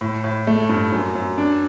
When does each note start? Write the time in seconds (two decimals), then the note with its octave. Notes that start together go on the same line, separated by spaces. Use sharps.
0.01 A2
0.24 A2
0.47 A3
0.69 G2
0.92 F#2
1.15 F#2
1.38 D4